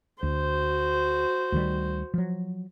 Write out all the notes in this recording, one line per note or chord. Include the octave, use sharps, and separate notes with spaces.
D2 F#4 C5
D2 D#3 G3
F3 F#3